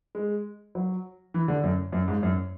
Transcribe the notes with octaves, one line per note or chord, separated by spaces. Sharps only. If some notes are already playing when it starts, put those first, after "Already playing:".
G#3
F#3
E3
D3
F#2
F#2
G#2
F#2